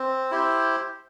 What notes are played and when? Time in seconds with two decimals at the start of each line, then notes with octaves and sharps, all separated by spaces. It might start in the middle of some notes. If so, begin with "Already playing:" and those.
Already playing: C4
0.31 E4 G4 C5